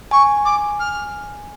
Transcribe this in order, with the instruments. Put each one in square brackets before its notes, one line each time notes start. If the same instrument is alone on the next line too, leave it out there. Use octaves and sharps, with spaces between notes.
[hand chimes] G#5 [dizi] C#6
[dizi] D6
F6